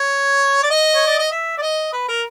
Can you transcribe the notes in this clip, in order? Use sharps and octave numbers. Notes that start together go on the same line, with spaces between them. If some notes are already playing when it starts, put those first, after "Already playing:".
Already playing: C#5
D5
D#5
C#5
D5
D#5
E5
D5
D#5
B4
A#4